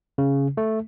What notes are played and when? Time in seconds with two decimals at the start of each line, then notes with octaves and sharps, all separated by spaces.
0.18 C#3
0.57 A3